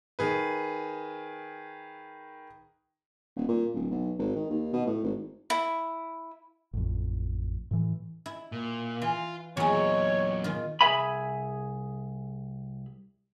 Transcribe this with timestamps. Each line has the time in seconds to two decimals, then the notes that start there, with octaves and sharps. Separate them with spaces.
0.19 D#3 G#4 B4
3.36 D#1
3.48 A#2
3.74 D1
3.91 B1
4.19 G#1
4.36 D#3
4.50 D#2
4.73 B2
4.86 A2
5.04 G#1
5.50 E4
6.73 A1 F2
7.71 A2 E3
8.26 E4
8.52 A#2
9.02 E3 F4
9.57 E2 A#2 F#3 D#4 C#5
10.44 D#3 F4
10.81 C2 G#4 E5 G#5 B5